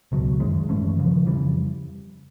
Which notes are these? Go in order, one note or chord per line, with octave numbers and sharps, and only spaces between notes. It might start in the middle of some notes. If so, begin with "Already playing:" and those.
C#2 B2 F#3
F#2 D#3 G#3
G2 E3 A3 C#4
D#2 C#3 F3
F2 C#3 E3 G3